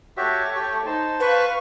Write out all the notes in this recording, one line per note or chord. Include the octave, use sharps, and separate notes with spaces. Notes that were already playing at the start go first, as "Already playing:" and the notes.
A3 F#4 G4 C#5 E5
G4
D#4 C5 A5
B4 F5 C#6